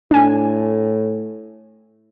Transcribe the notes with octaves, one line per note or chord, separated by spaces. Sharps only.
A2 D4 G#5